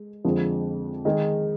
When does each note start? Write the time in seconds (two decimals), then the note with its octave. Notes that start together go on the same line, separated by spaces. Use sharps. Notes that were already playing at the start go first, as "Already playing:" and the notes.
Already playing: G#3
0.25 F2 D3 F3 G#3
1.05 D#3 G#3 D#4 G#4